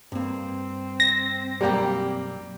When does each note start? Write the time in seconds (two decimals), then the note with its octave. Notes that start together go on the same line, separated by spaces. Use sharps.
0.12 G2 A#3 C4
1.00 A#6
1.61 B1 F#2 G3 A#3 G4 A#5